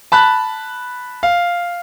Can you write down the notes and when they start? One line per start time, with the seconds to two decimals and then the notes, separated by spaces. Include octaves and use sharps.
0.12 A5 B5 F#6
1.23 F5